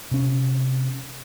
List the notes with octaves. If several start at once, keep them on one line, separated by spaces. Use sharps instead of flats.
C3 C#4